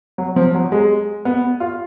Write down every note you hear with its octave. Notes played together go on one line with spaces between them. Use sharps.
F#3
F3
F#3
G#3
B3
F4